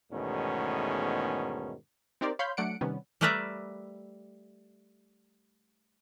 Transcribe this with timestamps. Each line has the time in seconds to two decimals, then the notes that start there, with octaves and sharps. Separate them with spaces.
0.12 E2 G#2 B2 D#3 A3 C#4
2.21 C4 D#4 G4 A#4 C5 D5
2.39 C#5 F5 B5 C6 G6
2.57 F#3 A3 D4 F#5 C#7 D7
2.81 C3 D#3 G3 B3 C#4
3.21 G3 A3 A#4 B4 D5 E5